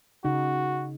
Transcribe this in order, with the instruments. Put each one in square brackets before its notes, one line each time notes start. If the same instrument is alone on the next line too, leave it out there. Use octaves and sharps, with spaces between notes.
[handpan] C#3 D#4 [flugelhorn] F#4